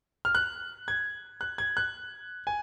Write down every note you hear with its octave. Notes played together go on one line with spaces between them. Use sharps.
F6
F#6
G#6
F#6
G#6
F#6
G#5